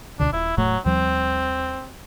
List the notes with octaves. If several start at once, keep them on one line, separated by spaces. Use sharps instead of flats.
C#2 B2 D3 D4
D#1 E4
E1 A2 F#3 A3
D#2 F3 G3 C4